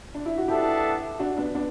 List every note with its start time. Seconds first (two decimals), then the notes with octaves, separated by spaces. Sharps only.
0.14 D4
0.26 E4
0.38 F#4
0.48 B3 D4 E4 G4 A4 E5
1.19 D4 F#4
1.37 B3 D4
1.55 B3 D4